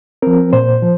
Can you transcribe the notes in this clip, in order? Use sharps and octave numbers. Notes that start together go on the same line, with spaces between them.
F3 C4 A#4
A#2 C5
F3